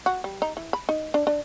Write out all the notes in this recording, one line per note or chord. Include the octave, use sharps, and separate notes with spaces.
F#4
G3
D#4
E3
B5
D#4
D4
D4